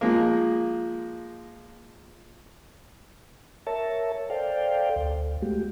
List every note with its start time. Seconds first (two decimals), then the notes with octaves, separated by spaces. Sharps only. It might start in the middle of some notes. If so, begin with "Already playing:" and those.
0.01 F3 G#3 A#3
3.67 A#4 C#5 E5 A5
4.30 A4 C5 D5 F5 G5
4.96 D2
5.42 G#3 A3 F#4 G4